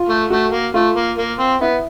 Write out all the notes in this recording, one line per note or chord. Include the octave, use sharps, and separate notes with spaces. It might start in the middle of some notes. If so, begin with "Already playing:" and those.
Already playing: F4
A3
A3 F#4
A#3
A3 F4
A#3
A#3
C4
B3 E4